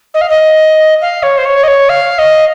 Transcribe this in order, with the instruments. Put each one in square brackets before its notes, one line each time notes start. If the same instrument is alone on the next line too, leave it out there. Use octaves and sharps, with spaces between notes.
[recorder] D#5
F5
D#5
F5
C#5
C5
C#5
D#5
C#5
F5
D#5